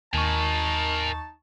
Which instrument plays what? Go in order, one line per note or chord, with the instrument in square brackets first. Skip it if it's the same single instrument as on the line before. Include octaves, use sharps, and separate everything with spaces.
[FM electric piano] D#2 C#6 [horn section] D#4 A5 [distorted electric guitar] A#4 G#5